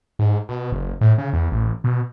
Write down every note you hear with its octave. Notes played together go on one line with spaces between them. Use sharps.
G#2
B2
F#1
A2
C#3
E2
A1
B2